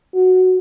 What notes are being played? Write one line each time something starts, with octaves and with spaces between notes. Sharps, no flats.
F#4